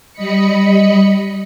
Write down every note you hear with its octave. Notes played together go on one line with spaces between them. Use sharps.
G3 D#5 B5 C#7